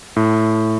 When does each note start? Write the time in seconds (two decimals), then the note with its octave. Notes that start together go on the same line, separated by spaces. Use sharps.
0.16 A2